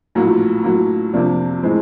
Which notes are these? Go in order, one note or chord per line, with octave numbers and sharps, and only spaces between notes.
A#1 A2 F#3 A#3
A2 F#3 A#3
F2 C3 F3 A#3 D4
A2 E3 G#3 C4